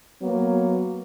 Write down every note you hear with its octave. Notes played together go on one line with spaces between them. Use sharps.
F#3 A#3 B3